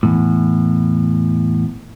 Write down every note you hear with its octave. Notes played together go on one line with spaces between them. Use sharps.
E2 A2